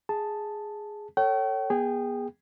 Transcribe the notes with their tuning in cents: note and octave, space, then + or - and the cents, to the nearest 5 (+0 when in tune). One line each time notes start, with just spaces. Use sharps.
G#4 +0 A5 +0
A4 +25 C#5 +0 G5 -40
B3 -35 G#4 -20 G5 +0